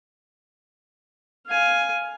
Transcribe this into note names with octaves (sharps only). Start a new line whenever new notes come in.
F5 G#5